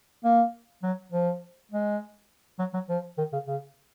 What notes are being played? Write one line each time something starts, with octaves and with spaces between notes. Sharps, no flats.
A#3
F#3
F3
G#3
F#3
F#3
F3
D#3
C#3
C#3